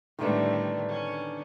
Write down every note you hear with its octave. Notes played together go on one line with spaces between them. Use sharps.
A2 D3 D#3 G3 A3 B3 D4
C#4